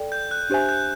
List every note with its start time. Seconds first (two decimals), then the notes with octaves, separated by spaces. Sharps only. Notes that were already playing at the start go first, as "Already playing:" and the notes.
Already playing: A4 D5 G5
0.12 G6
0.31 F#6
0.50 D4 G4 C5 E5 G#5
0.69 G6